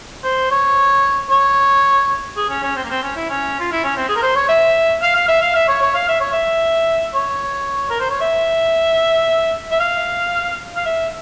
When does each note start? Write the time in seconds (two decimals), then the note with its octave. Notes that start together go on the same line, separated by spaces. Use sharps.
0.24 C5
0.51 C#5
1.30 C#5
2.37 G#4
2.50 C#4
2.63 C#4
2.76 C4
2.85 A#3
2.90 C4
3.03 C#4
3.16 E4
3.30 C#4
3.60 F4
3.72 E4
3.84 C#4
3.96 C4
4.09 G#4
4.16 A#4
4.22 C5
4.36 C#5
4.49 E5
5.02 F5
5.15 F5
5.28 E5
5.41 F5
5.55 E5
5.68 C#5
5.82 C#5
5.95 F5
6.08 E5
6.20 C#5
6.32 E5
7.15 C#5
7.90 A#4
8.00 C5
8.10 C#5
8.21 E5
9.71 E5
9.80 F5
10.77 F5
10.85 E5